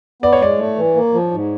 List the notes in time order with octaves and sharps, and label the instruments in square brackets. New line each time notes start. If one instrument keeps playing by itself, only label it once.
[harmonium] B3 [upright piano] D5
[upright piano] C#5
[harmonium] G#3 [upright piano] D5
[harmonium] A3
E3
A#3
F3
G#2